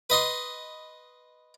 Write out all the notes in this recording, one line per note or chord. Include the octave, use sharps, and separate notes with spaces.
B4 D#5 C6